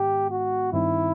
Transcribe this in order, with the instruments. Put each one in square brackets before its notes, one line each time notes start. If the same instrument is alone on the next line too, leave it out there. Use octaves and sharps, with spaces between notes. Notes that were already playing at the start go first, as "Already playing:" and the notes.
Already playing: [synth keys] G#2 D#3 G#3 B3 [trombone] G4
[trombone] F#4
[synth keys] G2 D#3 G3 C4 D#4 [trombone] E4